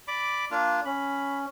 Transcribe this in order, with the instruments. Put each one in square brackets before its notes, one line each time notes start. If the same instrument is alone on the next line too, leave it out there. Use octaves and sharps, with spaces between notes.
[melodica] D5 B5 D6
A#3 D4 F4
[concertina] C#4 [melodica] B5